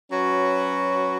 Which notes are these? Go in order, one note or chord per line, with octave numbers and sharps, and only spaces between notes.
F#3 C#4 F#4 B4